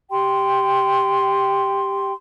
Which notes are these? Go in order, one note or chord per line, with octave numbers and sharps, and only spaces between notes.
G4 G5 C6